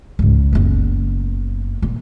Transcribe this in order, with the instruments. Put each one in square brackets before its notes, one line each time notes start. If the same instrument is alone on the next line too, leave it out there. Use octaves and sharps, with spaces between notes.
[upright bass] C#2 G#2
F#1 B3
A#2